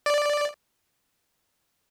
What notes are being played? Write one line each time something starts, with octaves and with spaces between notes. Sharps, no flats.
D5